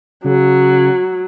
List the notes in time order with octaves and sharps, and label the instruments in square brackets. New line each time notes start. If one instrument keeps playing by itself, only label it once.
[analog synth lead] C#3 [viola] F#3